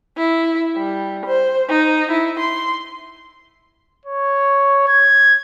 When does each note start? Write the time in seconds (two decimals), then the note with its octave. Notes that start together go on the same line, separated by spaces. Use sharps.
0.18 E4
0.77 G3
1.26 C5
1.70 D#4
2.11 E4
2.39 C6
4.05 C#5
4.88 G#6